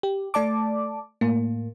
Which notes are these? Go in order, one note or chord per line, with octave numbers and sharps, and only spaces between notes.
G4
A3 D5 A5 D6
A2 A#3